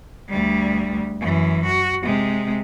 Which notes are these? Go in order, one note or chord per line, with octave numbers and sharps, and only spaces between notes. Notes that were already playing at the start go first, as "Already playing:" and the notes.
D2 G3
F#2 E3
F#4
C3 G#3